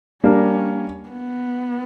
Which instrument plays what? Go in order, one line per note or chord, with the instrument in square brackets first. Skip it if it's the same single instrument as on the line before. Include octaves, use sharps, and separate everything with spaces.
[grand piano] G3 A#3 D4 A#4 [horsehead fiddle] C#4
[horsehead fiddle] B3